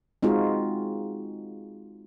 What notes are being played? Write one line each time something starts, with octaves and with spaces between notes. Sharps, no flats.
G#3 C4 D#4 F4 F#4 G#4